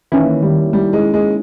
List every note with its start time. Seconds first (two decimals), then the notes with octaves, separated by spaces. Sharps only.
0.12 D#3 E3 A#3 C#4 E4
0.42 G3
0.73 G3
0.93 G#3
1.14 G#3